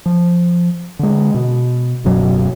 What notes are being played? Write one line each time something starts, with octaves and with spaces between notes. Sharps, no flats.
F3
D3 G#3
B2
D1 F#2 B2 F#3